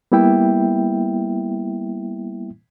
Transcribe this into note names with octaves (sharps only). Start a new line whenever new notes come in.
G3 A#3 B3 E4 E5 G5